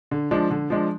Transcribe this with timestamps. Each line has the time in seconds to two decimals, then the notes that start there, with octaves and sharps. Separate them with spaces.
0.11 D3
0.31 F3 G#3 D4
0.51 D3
0.70 F3 G#3 D4